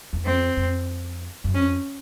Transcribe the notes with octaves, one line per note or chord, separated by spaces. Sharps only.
E2
F2 C4
F2
F#2
F2 C#4